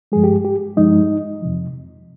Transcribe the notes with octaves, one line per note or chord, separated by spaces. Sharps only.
G2 F3 G#3 G#4
G4
G4
G2 F3 G#3 D#4 D#5
F2 C3 F3